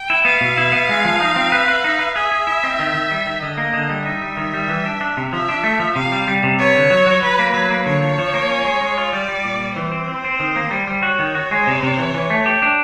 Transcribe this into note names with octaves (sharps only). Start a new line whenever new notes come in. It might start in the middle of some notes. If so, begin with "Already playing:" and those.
Already playing: G5
E4
B3 F5
B2
E4
B3
G#3
F3
D#4
C4
B4
B4
D#4
B4
G#4 E5
G#4
E4
C4
D#3
D#3
G3
D#3
D3 D#5
A#3
D3
G3
D#4 E5
G3
D#3
G3
E3
D4
D4
C3
F3 E5
D4
A3
F3
C3 F5
G3
G3
C3
B3 C#5
D3
F#3
F#3
F#3 B4
A#3
F#3 B4
A#3
D3 C#5
F3
F3
A#3
C#4
G#3
G#3
F4
G3 D5
G3
A#2
G3
E3 C5
C4
C4
C4
D#3
A#3
G3
G3
F#4 C#5
D#3
F#4
G#3
C3
C3
E3
E3
A3
G4
D4